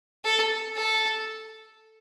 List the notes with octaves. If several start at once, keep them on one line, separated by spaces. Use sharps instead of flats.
A4
A4